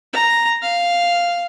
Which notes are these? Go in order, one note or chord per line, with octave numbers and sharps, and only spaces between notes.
A#5
F5